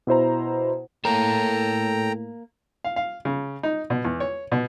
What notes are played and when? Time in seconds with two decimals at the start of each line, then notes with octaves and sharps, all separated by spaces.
0.07 B2 E4 C5 A#5
1.05 A2 A#3 A4 A#4 C#5 G5 A#5
2.84 F5
2.96 F5
3.25 C#3
3.63 D#4
3.90 B2
4.05 E2
4.20 C#5
4.52 B2